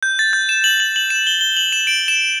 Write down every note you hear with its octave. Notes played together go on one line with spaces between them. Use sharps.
G6
A6
G6
E7
F#7
F#7
F#7
E7
G7
G7
F#7
E7
D7
E7